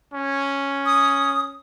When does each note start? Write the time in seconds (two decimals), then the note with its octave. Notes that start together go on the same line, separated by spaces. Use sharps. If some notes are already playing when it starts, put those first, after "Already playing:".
0.13 C#4
0.86 D#6